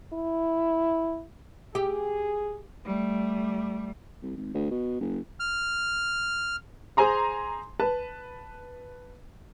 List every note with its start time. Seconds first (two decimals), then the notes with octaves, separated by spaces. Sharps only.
0.13 E4
1.75 G4 G#4
2.85 G3 A3
4.22 C2
4.36 G#1
4.54 D2
4.71 B2
5.01 F#1
5.40 F6
6.97 G#4 C5 G#5 A#5 C6
7.80 B4 A5